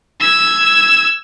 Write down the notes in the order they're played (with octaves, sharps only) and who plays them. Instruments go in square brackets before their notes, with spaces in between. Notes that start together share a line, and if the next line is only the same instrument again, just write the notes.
[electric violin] E6 G#6